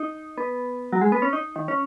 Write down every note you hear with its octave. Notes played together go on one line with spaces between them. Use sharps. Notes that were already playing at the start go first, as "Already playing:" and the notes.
Already playing: D#4
B3
F#3
G#3
B3
C#4
D#4
D#3
C#4